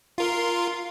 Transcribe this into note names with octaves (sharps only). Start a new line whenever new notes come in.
F4 A#4 C6